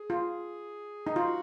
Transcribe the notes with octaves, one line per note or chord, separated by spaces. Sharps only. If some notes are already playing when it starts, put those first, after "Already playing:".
Already playing: G#4
F4
D#4
F4 F#4